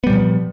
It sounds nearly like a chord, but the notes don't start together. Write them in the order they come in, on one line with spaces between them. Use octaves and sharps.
B3 G3 A#2 F3